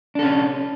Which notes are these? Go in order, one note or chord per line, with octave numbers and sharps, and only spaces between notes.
C#4 D4 A4